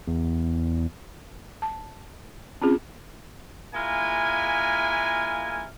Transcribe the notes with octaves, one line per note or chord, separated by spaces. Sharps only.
E2
A5
C4 C#4 F4 G#4
G#3 A#3 E4 F4 G#5